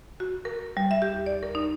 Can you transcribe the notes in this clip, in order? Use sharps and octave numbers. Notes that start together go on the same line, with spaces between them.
F#4
A#4
A#4
G3
E5
G4
D#2
D5
A#4
D#4